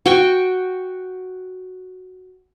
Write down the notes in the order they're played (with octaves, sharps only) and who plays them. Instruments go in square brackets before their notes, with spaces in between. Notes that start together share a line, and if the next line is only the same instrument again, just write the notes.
[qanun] F#4 G5 C#6